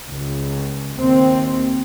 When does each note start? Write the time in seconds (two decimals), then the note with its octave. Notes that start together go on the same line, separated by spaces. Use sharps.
0.11 C#2
0.97 D#2 C4